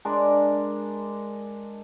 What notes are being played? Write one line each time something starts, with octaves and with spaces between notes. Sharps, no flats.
G#3 D4 A#4 D5